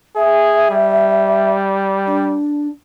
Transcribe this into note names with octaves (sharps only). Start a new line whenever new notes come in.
G#4 E5
G3
D4